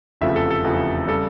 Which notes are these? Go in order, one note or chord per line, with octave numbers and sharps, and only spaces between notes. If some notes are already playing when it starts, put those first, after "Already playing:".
F1 E2 C#3 F3 A3 E5
A4
A4
F1 E2 C#3 F3 A3
C#3 G3 A4